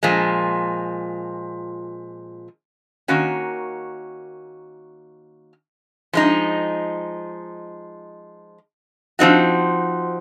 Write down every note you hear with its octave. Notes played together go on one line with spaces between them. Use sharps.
A#2 F3 G#3
D#3 A#3 C#4 F#4
F3 G#3 D#4
F3 C4 D#4 F#4